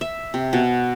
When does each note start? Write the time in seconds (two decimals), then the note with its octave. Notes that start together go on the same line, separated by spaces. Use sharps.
0.01 E5
0.34 C3
0.53 B2